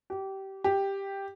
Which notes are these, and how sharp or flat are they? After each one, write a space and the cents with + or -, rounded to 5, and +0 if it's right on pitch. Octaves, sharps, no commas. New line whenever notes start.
G4 -20
G4 +5